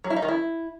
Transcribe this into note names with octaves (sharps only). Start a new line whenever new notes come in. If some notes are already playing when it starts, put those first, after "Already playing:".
F#3
E4
D#4
D#3
E4